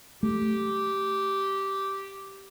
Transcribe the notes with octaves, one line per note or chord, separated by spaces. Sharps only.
A3 G4